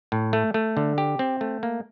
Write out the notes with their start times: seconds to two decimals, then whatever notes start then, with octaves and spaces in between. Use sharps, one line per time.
0.12 A2
0.33 A3
0.54 A3
0.77 D3
0.98 G4
1.19 C4
1.41 A3
1.63 A#3